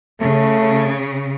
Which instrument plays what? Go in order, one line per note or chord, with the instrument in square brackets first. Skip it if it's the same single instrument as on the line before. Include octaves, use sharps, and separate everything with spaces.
[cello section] C#3 [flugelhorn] A3